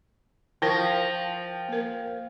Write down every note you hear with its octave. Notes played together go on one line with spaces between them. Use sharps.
F3 E4 A#4 G5 A5 A#6
A#3 A#4